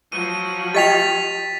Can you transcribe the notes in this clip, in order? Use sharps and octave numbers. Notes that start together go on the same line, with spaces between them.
F3 F#3 D#7
G4 D#5 G5 A6 B6 F7